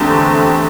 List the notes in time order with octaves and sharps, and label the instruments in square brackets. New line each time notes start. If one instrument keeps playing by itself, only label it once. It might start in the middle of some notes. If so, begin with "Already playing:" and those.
Already playing: [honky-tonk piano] E2 D3 A3 C4 G4